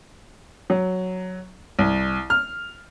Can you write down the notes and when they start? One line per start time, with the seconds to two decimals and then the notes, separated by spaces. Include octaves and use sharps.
0.70 F#3
1.79 C2
2.30 F6